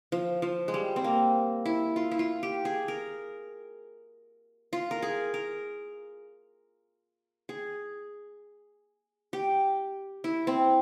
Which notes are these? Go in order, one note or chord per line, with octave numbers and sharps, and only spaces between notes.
F3
F3
G#3
G3
C4
A#3
E4
F4
E4
F4
G4
G#4
A#4
F4
A#4
G#4
A#4
G#4
G4
E4
C4